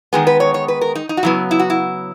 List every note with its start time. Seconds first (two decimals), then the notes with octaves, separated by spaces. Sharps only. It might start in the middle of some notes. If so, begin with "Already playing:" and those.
0.13 D#3 G#3 B3 G#4
0.27 B4
0.40 C#5
0.54 C#5
0.68 B4
0.81 A#4
0.95 D#4
1.09 D#4
1.17 F#4
1.23 C#3 F#3 B3 E4
1.51 E4
1.59 F#4
1.70 E4